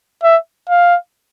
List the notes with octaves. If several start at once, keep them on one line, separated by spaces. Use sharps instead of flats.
E5
F5